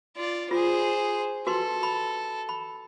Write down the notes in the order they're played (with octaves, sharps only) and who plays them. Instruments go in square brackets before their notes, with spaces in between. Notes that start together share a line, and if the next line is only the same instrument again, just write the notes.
[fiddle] F4 D5
[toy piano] F4 [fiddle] G#4 C5
[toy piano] F#4 B4 C6 [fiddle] A4
[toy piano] B5
B5